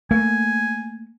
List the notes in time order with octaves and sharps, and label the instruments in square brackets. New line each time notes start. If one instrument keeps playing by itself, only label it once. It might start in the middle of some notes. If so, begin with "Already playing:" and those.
[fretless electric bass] A3 A#3 [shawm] G#5